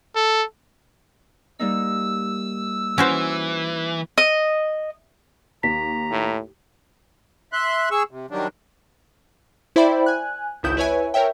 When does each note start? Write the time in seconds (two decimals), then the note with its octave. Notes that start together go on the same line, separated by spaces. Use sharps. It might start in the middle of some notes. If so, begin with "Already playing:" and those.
0.16 A4
1.59 G3 A#3 D#4 E6
2.98 E3 C#4 F#4 C5
4.18 D#5
5.63 D#2 A#5 B6
6.11 A2
7.53 E5 C6 F#6
7.91 G#4 C#6 E6
8.11 C3
8.31 D#3 F#3 G3 D4
9.76 E4 C5 D5 E5 G5 B5
10.06 G#5 F#6
10.63 G#1 C#2 E4 D#6 G6 E7
10.77 E4 B4 C#5 E5 G#5
11.14 A#4 C#5 E5 G5